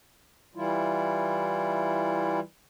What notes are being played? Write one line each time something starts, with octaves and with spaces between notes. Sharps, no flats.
E3 G3 E4 F4